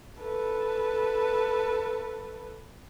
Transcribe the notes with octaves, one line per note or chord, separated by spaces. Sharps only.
A4 B4